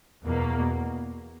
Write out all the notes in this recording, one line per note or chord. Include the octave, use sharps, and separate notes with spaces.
E2 B2 A#3